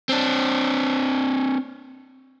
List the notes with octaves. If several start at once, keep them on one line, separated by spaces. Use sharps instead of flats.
C4 D4